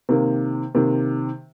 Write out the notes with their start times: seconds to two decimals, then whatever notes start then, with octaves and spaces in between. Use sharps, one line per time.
0.09 C3 D#3 A#3
0.75 C3 D#3 A#3